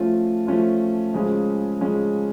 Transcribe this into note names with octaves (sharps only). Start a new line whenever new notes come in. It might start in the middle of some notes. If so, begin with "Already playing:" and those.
Already playing: F3 A3 C#4 F4
F3 A3 C#4 F4
C#3 F3 G#3 C#4
C#3 F3 G#3 C#4